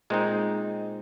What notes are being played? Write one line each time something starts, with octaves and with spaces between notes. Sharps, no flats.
A#2 G#3 C4 D#4